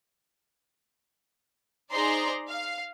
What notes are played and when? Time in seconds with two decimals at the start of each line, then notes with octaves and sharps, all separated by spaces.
1.91 D#4 G#4 C5 D5 A#5 C6
2.49 F5